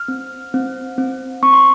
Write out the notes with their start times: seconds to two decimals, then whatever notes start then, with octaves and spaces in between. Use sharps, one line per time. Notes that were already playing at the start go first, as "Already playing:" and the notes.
Already playing: F6
0.08 C4
0.54 C4
0.98 C4
1.43 C4 C#6
1.53 C6